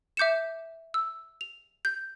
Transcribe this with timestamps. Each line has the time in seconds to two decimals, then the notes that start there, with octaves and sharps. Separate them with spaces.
0.17 E5 D6 G6 C#7 E7
0.94 E6
1.41 F7
1.85 G6